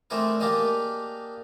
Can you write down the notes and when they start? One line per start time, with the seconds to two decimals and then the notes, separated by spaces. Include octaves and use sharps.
0.10 A3 C4 D4 E4 G#4 A#4
0.40 A#3 D4 G4 G#4 A#4 D#5